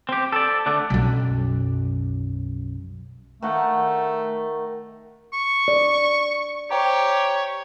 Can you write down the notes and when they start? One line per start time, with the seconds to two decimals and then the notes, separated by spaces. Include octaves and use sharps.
0.09 C4 G4
0.32 A4 D5
0.66 D3 A3 D4
0.90 B1 F#2
3.42 D#3 A3 F#5
5.33 C#6
5.68 D5
6.71 G4 C5 C#5 G5 A#5